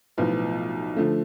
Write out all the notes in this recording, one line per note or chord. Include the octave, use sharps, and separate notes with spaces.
B1 A2 F3 B3 F4
D3 F3 A3